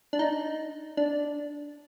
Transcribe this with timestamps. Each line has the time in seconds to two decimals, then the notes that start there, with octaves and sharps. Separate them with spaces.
0.13 D4
0.19 D#4
0.97 D4